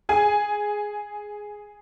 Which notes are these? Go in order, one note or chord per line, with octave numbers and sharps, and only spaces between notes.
G#4 G#5